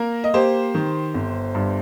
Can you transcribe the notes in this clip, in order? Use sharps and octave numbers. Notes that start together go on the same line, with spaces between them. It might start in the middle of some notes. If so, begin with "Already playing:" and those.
Already playing: A#3 A#4
D#5
A#3 G4 C5
D#3
G1
G2